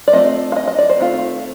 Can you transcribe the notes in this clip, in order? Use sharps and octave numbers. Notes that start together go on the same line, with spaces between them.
D5
A3 C4 F4 D#5
F5
D#5
D#5
D5
C5
D#3 A3 C4 F4